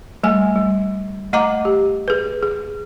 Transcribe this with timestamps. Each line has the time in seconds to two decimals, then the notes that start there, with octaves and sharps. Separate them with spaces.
0.24 G3 A3 G#5
0.55 G3
1.33 A3 D#5 F#5 A#5 D6
1.65 G4
2.08 G#4 B4
2.43 G#4